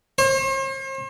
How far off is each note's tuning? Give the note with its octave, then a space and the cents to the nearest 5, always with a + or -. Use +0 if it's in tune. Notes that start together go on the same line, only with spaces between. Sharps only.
C5 +45